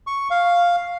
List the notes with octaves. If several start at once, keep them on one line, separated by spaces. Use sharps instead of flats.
C#6
F5